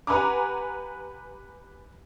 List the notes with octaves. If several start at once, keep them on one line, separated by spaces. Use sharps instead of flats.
G4 B4 F#5 G#5 A#5 D6